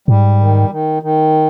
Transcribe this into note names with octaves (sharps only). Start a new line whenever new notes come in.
G#2 G3
D#3
D#3
D#3